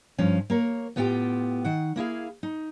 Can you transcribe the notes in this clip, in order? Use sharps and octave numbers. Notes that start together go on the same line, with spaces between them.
G2 F3 C#4
A#3 A#4 C#5
A2 B3 F4 G4 F#5 G5
D#3 F#5
A#3 E4 G#4 F5
D#4